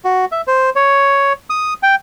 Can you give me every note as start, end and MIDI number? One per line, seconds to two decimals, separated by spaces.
0.05 0.25 66
0.32 0.41 76
0.47 0.70 72
0.76 1.33 73
1.50 1.74 87
1.83 1.95 79